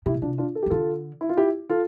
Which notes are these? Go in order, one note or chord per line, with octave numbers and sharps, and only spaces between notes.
C3 E4 G4
B2
C3 D4 F4
D4 F4
A4
G4
E3
D3 F4 A4
E4
F4
E4 G4
F4 A4